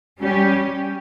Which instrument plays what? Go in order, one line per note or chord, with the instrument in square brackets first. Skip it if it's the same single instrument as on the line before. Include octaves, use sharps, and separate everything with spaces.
[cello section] G3 C#4 G4